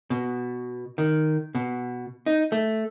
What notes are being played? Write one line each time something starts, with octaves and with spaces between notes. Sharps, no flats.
B2
D#3
B2
D#4
A3